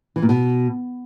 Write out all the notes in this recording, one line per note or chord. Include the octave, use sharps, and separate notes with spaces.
E3
A#2
B2